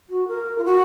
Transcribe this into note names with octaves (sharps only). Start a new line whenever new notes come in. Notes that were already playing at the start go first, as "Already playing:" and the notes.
F#4
A#4
F4
F#4